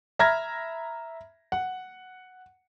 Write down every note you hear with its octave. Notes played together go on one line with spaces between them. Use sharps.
E5 A#5 B5 F6 G#6 A#6
F#5